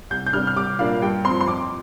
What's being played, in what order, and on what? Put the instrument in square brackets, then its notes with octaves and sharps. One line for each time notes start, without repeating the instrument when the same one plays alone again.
[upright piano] C2 G6
G6
C3 G3 D4 F6
F6
C2 D6
A#2 G3 A#3 D4 F5
G2 G5
C4 C6
F3
C6
F2 D6